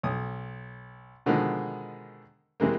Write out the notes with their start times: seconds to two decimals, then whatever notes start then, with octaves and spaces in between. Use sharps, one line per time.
0.03 B1 D#6
1.26 B2 D3 D#3 F3 G#3
2.60 C3 E3 G#3 A#3